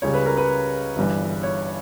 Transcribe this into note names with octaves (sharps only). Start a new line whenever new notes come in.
C#2 C#3 G3 C#5
B4
A#4
B4
G1 G2 E3
C#5